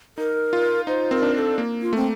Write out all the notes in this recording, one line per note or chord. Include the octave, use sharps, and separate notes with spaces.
D#4 A#4
F4
D#4 C5
C4 A#4
D4
A#4
A4
A#3
F4
A3 C4